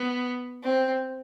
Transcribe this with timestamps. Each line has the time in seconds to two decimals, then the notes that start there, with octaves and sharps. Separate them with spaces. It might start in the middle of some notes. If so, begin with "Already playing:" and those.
Already playing: B3
0.63 C4